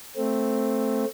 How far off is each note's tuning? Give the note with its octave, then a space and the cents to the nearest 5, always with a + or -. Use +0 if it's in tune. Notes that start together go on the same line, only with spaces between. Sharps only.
A3 +0 C4 +0